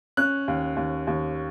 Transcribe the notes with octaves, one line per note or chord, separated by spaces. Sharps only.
C#4 F#6
D#2
D#2
D#2